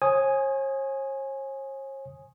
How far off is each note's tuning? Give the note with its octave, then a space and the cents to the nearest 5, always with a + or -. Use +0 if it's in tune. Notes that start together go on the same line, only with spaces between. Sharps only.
C#5 -45 G#5 +0 D#6 +0